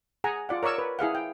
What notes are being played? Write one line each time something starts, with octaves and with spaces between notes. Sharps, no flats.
G#4 F#5 G#5 A#5
F4 D5 F#5
A#4 C#5 D5 C#6 E6
B4
E4 G#4 F5 F#5
G5